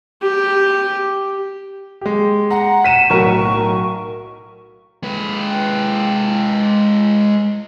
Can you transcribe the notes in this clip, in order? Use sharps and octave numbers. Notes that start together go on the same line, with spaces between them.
G4
G#3 G4
F#5 A#5
B6 D#7 E7
B1 A2 F#4 A#4 C#6
G#3 B4